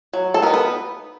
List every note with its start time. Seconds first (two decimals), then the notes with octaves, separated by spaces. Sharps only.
0.13 F#3
0.34 A4
0.42 B3 D#4 A#4
0.54 B4